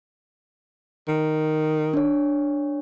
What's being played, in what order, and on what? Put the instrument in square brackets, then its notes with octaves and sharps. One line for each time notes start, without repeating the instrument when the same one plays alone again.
[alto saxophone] D#3
[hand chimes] D4 C#5